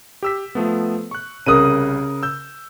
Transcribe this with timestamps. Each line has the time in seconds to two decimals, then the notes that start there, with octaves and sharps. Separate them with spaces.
0.23 G4 E6 B6
0.55 F3 A3 B3
1.11 C#6 F#6
1.46 C2 C#3 A#4 D#6 F#6 D#7
2.23 E6 G6